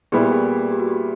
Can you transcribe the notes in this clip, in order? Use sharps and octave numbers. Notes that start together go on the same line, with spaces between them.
A#2 G3 B3 E4 G#4
G4
G#4
G4
F#4
G4